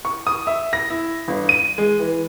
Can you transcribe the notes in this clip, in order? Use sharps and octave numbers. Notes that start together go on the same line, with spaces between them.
C#6
D#6
E5
A#6
E4
G1
D#7
G#3
E3